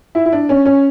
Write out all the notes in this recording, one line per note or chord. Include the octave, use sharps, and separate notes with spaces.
E4
E4
D4
C#4
C#4